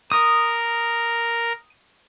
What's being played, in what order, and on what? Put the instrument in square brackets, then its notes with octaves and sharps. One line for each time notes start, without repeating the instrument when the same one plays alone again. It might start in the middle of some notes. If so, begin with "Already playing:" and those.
[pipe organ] A#4 [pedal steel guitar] D#6